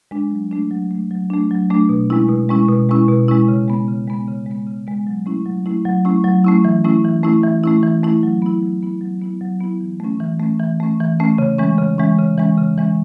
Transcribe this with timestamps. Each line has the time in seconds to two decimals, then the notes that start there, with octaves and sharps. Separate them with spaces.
0.11 G#3 D4
0.31 F#3
0.51 A3 D4
0.70 F#3
0.91 A3 D4
1.11 F#3
1.30 A3 D4
1.51 F#3
1.70 A3 D4
1.89 B2
2.10 G#3 C#4 E4
2.29 B2
2.49 G#3 C#4 E4
2.69 B2
2.89 G#3 C#4 E4
3.08 B2
3.28 G#3 C#4 E4
3.48 C#3
3.68 G#3 B3
3.88 C#3
4.07 G#3 B3
4.28 C#3
4.46 G#3
4.51 B3
4.67 C#3
4.87 G#3 B3
5.07 F#3
5.26 A3 C#4 E4
5.46 F#3
5.66 A3 C#4 E4
5.85 F#3
6.05 A3 C#4 E4
6.24 F#3
6.44 A3 C#4 E4
6.65 E3
6.84 A3 C#4 E4
7.04 E3
7.23 A3 C#4 E4
7.43 E3
7.64 A3 C#4 E4
7.83 E3
8.03 A3 C#4 E4
8.23 F#3
8.42 B3 E4
8.63 F#3
8.83 B3 E4
9.01 F#3
9.22 B3 E4
9.41 F#3
9.61 B3 E4
9.81 E3
10.00 A3 C#4
10.20 E3
10.40 A3 C#4
10.60 E3
10.80 A3 C#4
11.00 E3
11.20 A3 C#4
11.38 C#3
11.58 E3 G#3 C#4
11.78 C#3
11.98 E3 G#3 C#4
12.19 C#3
12.38 E3 G#3 C#4
12.58 C#3
12.78 E3 G#3 C#4